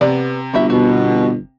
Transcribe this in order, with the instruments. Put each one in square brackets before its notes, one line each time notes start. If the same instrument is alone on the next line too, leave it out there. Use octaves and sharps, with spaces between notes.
[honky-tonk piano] C3 [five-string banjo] B3 D5 F#5
[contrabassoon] G1 [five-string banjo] E4 F#4 E5
[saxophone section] B2 [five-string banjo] F#4